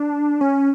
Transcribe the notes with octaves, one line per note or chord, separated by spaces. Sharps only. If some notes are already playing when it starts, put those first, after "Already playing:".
Already playing: D4
C#4